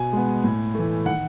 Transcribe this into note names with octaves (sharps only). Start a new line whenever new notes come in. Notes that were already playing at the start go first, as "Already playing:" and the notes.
Already playing: B2 G#5
G#3 B3
A2
E3 A3
D#3 F#5